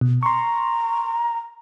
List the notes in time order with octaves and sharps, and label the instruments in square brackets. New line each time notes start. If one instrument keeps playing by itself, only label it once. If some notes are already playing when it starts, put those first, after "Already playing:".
[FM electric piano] B2
[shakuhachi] A#5 [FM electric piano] C6 C#6